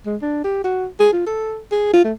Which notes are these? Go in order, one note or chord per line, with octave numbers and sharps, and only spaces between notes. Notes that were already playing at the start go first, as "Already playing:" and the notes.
G#3
D4
G4
F#4
G#4
F4
A4
G#4
F4
A3